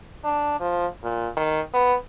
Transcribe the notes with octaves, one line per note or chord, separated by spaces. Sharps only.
D4
F3
A#2
D#3
B3